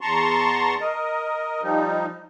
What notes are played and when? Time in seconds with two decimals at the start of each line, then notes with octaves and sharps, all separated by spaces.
0.01 E2 A5 A#5 C6 C#6
0.81 A#4 D#5
1.62 F3 G3 D#4